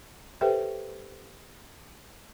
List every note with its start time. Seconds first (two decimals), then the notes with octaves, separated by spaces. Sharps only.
0.41 G4 A4 B4 C5 E5 G5